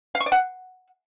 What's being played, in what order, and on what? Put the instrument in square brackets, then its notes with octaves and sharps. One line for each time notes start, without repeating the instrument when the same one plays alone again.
[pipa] F5
C#6
D5
F#5